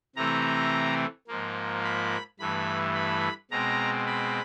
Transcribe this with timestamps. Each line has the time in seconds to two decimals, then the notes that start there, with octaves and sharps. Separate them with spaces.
0.16 C3 E3 A3 C4 A#5
1.28 G#2 F3 A#3
1.84 B5
2.39 G2 E3 A3 B5
2.95 B5
3.51 B2 G#3 C4 A#5
4.07 B5